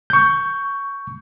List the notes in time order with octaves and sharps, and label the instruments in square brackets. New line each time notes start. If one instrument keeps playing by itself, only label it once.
[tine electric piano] C#6 G6